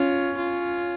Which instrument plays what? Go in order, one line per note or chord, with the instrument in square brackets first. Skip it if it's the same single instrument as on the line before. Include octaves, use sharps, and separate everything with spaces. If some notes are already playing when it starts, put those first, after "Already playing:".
Already playing: [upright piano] C#4 [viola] F4
[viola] F4